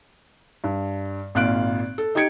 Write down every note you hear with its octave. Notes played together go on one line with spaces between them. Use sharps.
G2
G#1 A#2 F5 F#6 D7
A4
D#4 G4 D#5 G#6 C#7 D7